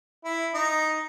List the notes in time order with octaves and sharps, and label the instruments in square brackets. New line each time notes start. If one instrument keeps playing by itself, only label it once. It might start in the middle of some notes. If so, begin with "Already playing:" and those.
[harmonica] E4
D#4